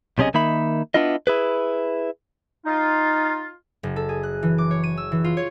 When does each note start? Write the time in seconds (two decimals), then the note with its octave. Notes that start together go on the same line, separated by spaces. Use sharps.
0.18 B1 C3 C#4 G#4 D#5
0.34 D#3 A#3 D#4 E5 B5
0.94 B3 D4 E4 F4 D#5
1.27 E4 G#4 B4
2.66 D#4 F4
3.83 F#1
3.96 A4
4.09 G#4
4.23 F#6
4.43 E3
4.58 D6
4.71 C#5
4.84 D#7
4.97 E6
5.12 E3
5.24 F4
5.37 C#5